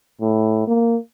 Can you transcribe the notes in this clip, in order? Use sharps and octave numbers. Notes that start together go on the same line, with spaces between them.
A2
A#3